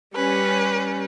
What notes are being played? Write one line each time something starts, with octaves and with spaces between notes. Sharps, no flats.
G3 C#4 B4